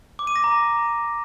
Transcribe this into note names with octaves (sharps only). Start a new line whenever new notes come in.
D6
D#7
A#6
A#5